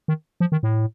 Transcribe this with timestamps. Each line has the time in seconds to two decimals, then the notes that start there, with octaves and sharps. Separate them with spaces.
0.08 D#3
0.40 F3
0.52 D#3
0.63 A2